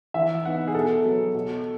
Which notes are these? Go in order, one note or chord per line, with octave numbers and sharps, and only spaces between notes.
E3 E5
B3 D#4 F#5
G#4
B2 A4
F#3 B3
B2